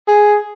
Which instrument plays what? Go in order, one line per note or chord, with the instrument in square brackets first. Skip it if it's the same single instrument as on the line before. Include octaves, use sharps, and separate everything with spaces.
[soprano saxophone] G#4